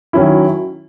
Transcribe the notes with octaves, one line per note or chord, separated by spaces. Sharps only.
D#3 F#3 C#4 E4